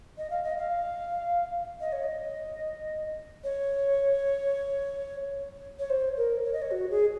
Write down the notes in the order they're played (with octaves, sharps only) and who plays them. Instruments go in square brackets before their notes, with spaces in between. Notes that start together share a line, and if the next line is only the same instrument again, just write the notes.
[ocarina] D#5
F5
D#5
F5
D#5
C#5
D#5
C#5
C#5
C5
A#4
C#5
D#5
C#5
F#4
G#4